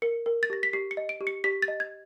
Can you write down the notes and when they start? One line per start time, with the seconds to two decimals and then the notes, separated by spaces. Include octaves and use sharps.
0.02 A#4 C#7
0.26 A#4
0.43 A6
0.50 G4 A#6
0.63 B6
0.73 G4 C7
0.91 C#7
0.97 D#5
1.09 D7
1.21 G4
1.27 C#7
1.44 G4 B6
1.62 A6
1.68 D#5
1.80 G#6